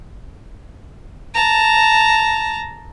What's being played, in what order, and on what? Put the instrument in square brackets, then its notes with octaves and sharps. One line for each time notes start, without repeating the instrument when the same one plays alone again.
[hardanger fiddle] A5 A#5